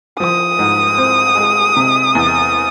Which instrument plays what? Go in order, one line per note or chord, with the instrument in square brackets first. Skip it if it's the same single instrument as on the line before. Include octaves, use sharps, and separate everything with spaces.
[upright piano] F3 [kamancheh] D#6
[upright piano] G#2
C4
G#3
C3
E2